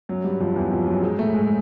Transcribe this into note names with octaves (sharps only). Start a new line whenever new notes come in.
F#2 F#3
G2 G3
F2 F3
E2 E3
F2 F3
F#2 F#3
G#2 G#3
A2 A3
G#2 G#3